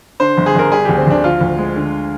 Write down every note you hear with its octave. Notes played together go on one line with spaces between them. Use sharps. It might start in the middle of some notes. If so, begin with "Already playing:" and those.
D3 C5
G1
G#4
G1 A#4
G3 G#4
D2 G4
C4
D2 D4
F3 F4
D2
G#3
D3